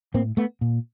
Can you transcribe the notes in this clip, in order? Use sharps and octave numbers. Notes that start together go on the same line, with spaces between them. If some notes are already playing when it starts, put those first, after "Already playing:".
A2 A#3 C4
A3 B3
A#2